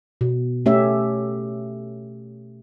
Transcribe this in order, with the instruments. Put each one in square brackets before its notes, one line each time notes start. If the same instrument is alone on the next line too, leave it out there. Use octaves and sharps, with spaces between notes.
[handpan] B2
A3 C#4 G4 C#5 E5